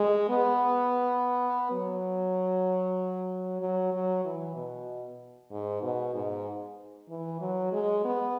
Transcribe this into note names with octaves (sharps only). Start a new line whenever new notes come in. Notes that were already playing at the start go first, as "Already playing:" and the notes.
Already playing: G#3
B3
F#3
F#3
F#3
E3
B2
G#2
B2
G#2
E3
F#3
G#3
B3